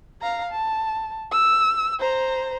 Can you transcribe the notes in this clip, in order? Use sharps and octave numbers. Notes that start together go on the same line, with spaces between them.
F5 A#5
A5
E6
C5 A#5